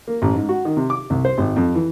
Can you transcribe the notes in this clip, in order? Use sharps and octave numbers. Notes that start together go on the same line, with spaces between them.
A#3
A1
G#2
F#4
D#3
C3
D6
C2
C5
G#1
F2
E3